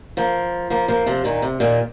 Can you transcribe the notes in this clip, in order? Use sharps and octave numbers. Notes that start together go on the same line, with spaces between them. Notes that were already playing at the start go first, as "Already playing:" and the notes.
F3 A#3
F3 A#3
F3 A#3
C3 F3
A#2 D#3
C3
A#2 D#3